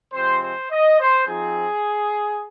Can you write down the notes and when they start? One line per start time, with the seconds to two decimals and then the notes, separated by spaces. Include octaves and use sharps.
0.13 C3 F3 G#3 C4 C5
0.42 C5
0.71 D#5
1.00 C5
1.27 F3 C4 D#4 G#4